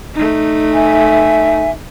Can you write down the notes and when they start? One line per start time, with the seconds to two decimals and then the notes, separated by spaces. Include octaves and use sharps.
0.14 A3 D#4
0.74 E5 G#5